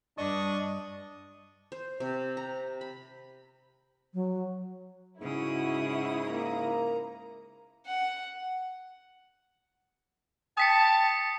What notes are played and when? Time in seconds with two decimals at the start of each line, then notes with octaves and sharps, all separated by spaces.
0.18 G2 D4 D#5 C#6 D#6
1.72 C5
2.00 C3
2.37 A#5
2.81 B5
4.14 F#3
5.21 G#2 C#3 E4 F#4 D#6
6.26 A#3 A#5
7.86 F#5
10.57 G5 A5 D#6 B6 C#7